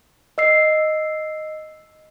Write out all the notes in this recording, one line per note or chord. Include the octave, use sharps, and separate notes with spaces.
D#5 E6 C7